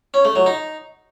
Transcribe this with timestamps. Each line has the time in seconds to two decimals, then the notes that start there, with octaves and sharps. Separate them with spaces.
0.14 C#4
0.25 A3
0.35 F#3
0.46 D#4